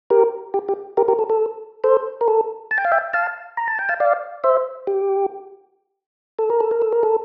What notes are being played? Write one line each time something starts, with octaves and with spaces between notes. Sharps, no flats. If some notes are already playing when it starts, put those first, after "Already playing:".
G4 A#4
G4
G4
G4 A#4
G4 A#4
A4
A4
A4 C5
A#4
A4
A5
G5
F5
E5 G5
F5 A5
A#5
A5
G5
F5 A5
D5 F5
C5 E5
G4
A4
A#4
A4
A#4
A4
A#4
A4